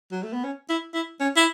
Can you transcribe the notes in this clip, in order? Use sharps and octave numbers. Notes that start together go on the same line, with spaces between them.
F#3
A3
B3
C#4
E4
E4
C#4
E4